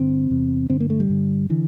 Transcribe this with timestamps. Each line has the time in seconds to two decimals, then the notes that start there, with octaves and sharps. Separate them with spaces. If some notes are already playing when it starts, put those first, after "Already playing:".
Already playing: G2 D3 C4
0.30 E2 C3
0.70 G2 D3 C4
0.80 A#3
0.90 A3
1.00 G3
1.09 G2 D3
1.50 D3 E3